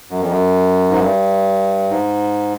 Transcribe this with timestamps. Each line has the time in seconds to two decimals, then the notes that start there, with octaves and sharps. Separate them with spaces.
0.10 F#2
0.20 F2
0.30 F#2
0.90 G#2
1.00 G2
1.90 G#2